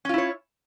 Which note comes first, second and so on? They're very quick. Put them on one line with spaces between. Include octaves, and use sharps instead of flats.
C#4 F4 E4 C#5